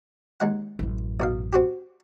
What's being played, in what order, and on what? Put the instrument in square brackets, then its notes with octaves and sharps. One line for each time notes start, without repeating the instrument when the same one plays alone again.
[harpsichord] D#2 G#3 F#5
[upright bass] A1 F#2
[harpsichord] B1 B2 F5
C4 F#4 G4